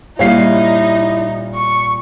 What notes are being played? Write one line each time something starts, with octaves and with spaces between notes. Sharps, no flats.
A#2 G3 D#4 E4 C#5 F5 C7
C#6